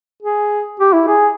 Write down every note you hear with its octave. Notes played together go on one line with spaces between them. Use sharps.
G#4
G4
E4
G#4